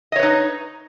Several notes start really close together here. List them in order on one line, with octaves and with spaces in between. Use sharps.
D#5 C#5 B4 D#4